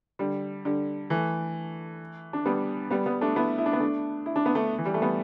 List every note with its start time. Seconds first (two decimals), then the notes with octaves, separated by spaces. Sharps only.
0.19 D3 G3
0.65 D3 G3
1.10 E3 A3
2.33 D4
2.45 G3 B3
2.90 G3 B3
3.06 G3 B3
3.21 A3 D4
3.36 B3 E4
3.58 E4
3.66 D4
3.73 B3
3.80 A3 D4
4.26 E4
4.36 D4
4.46 B3
4.55 A3 D4
4.78 E3
4.85 G3
4.94 A3
5.02 G3 B3